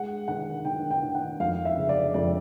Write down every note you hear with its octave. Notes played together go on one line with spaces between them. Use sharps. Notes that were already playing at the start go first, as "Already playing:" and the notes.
Already playing: G#3 F#5
D#3 F#5
D#3 G5
G5
D#3
F#5
F2 F5
E5
C#3
D5
F2 D5